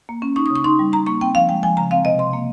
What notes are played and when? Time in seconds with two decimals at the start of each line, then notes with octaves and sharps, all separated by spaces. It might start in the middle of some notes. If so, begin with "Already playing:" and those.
0.09 A#3
0.22 C#4
0.36 D#4 C#6
0.46 C#3 D#6
0.55 C#6
0.64 D#4 C6
0.79 G3
0.92 D#4 A#5
1.06 A#3 C#6
1.21 C4 G5
1.35 F3 F5
1.49 G#3 G5
1.63 F3 G#5
1.77 C#3 A#5
1.91 C4 F5
2.05 C3 D#5
2.19 C3 C6
2.33 A#3